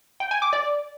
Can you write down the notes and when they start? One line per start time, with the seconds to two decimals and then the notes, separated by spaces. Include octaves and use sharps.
0.20 G5
0.31 G#5
0.42 D6
0.53 D5